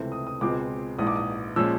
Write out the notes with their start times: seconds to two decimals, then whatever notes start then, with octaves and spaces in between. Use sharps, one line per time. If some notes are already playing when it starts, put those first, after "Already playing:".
Already playing: C#2 C3 E3 A3 C4
0.12 D#6
0.27 D#6
0.41 C#2 B2 G#3 C4 F4 D6
0.98 A#1 G#2 E3 D#6
1.07 D6
1.16 D#6
1.56 A#2 F3 G#3 C#4 E6